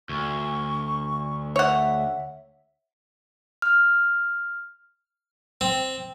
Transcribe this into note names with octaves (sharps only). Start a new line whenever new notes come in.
D2 C#6
C#5 E5 F#5
F6
C4